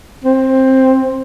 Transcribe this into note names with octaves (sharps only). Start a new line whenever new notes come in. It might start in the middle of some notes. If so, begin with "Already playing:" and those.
C4